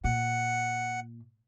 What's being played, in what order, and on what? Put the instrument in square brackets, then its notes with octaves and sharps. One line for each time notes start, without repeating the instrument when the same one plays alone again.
[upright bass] A#2 [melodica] F#5